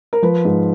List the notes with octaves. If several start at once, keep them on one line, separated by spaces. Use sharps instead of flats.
A#4
F3 B4
G#2